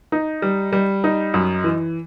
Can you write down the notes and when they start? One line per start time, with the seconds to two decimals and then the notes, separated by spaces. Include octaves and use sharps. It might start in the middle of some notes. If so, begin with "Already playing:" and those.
0.12 D#4
0.42 G3
0.73 G3
1.04 D#4
1.34 F#2
1.64 E3